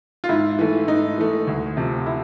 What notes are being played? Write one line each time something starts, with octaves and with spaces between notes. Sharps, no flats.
F4
G#2 E4
E3 A3
G#2 D#4
E3 A3
D2
C3 F3
E4